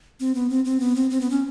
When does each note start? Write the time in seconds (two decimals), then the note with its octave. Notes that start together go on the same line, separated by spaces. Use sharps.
0.20 C4
0.35 B3
0.50 C4
0.65 C4
0.80 B3
0.96 C4
1.10 C4
1.21 B3
1.30 C#4